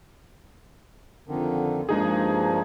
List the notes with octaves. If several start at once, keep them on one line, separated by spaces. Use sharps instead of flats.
F2 D3 D#3
G2 F3 G#3 A#3 D#4 G#4